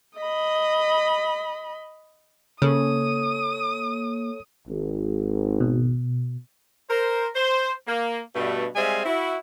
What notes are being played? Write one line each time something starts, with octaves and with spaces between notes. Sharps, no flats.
D#5 B5
C#3 A#3 A4 C#5 D#6
G#1
B2
A#4 C5
C5
A#3
G2 B2 A3
G3 G#3 C4 E5 F5 G#5
E4 F#4